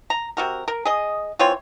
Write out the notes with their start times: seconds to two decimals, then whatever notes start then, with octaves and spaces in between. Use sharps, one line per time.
0.10 A#5
0.37 C3 F#4 A#4
0.68 A#4
0.85 G#4 D#5
1.39 E3 C4 F4 C#5